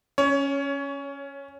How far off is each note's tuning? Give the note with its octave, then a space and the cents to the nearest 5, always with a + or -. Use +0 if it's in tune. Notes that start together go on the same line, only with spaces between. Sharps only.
C#4 +0 C#5 +20